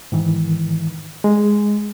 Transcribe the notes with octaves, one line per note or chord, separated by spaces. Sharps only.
G#2 D#3 E3
G#3